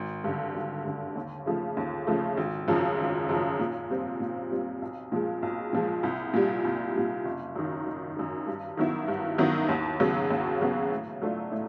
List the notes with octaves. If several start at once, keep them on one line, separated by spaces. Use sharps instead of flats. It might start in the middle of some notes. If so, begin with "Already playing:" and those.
Already playing: G#1
G2 D3
G#1
G2 D3
D#2
C#3 F3 A3
D#2
C#3 F3 A3
G#1
F#2 C#3 F3
G#1
F#2 C#3 F3
A#2
G3 C4 F4
A#2
G3 C4 F4
B1
A#2 F3 G#3
B1
A#2 F3 G#3
C2
A#2 G3
C2
A#2 G3
F#1
F#2 D#3
F#1
F#2 D#3
G2
D#3 F#3 B3 E4
G2
D#3 F#3 B3 E4
D#2
C#3 F#3 B3
D#2
C#3 F#3 B3
A2
F#3 A3 D4 F4
A2